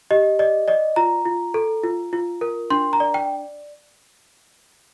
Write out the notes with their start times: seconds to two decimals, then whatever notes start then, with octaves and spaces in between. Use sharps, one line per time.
0.11 G4 D#5
0.39 D5 D#5
0.68 D5 D#5
0.96 F4 A#5
1.26 F4
1.54 A4
1.84 F4
2.13 F4
2.41 A#4
2.70 D4 C6
2.93 A#5
3.00 D5
3.14 G5